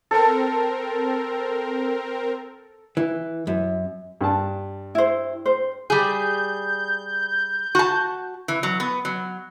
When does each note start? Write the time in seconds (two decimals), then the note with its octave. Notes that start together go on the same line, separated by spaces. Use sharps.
0.11 C4 A4 A#4
2.97 E3
3.47 F#2
4.21 G2 A5
4.95 E4 C5
5.46 C5
5.90 G3 G#4 G6
7.75 F#4 A5
8.48 E3
8.63 F#3
8.80 B3
9.05 F#3